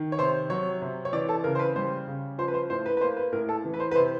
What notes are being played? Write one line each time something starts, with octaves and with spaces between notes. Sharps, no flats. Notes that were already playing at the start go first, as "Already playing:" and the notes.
Already playing: D#3
C#5
C3 C5
F#3 C#5
C3
C#5
E3 D5
A4
C#3 A#4
C5
B4
G3 C5
C#3
F3 C5
B4
C5
A2 C5
B4
B4
A#3 C5
B4
A2 A#4
A4
E3
B4
C5
B4
C3 C5